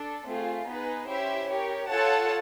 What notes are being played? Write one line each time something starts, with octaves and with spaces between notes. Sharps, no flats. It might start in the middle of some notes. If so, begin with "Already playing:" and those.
Already playing: D4 A4
A3 C4 F4 G#4
B3 D#4 G#4 B4
C#4 E4 G4 C5 E5
G4 A#4 C#5
F4 A4 C#5 F#5 A5